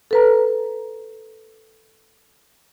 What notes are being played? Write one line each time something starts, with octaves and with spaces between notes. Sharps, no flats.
A4 B4 A#5